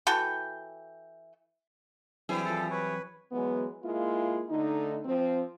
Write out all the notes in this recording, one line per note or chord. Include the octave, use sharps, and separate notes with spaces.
E3 F#4 A4 G5
E3 F#3 G3 C4 E4 G#4
F3 A4
B4 C#5
E3 F#3 G#3 B3
G#3 A#3 E4 F4
D3 A3 D#4
F3 C4